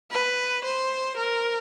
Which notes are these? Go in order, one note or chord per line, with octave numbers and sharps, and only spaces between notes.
B4
C5
A#4